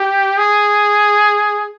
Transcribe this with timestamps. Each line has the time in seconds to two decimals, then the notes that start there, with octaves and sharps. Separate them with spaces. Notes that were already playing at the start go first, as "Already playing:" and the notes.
Already playing: G4
0.38 G#4